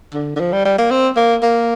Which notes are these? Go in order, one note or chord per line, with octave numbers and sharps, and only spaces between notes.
D3
D3
F3
G3
G3
A#3
C4
A#3
A#3